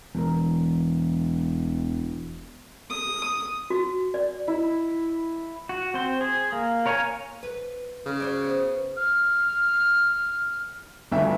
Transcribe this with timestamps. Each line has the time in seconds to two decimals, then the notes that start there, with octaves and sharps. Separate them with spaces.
0.15 E1 E2 A#4
2.90 D#6
3.70 F#4
4.14 D5
4.48 E4
5.69 F#4
5.94 C4 C5
6.21 G#4
6.52 A#3
6.86 A#4 C#5 F5 G5 G#5
7.43 B4
8.06 C#3
8.20 F#4 C5 D5
8.44 B3
8.96 F6
11.12 G1 D2 E5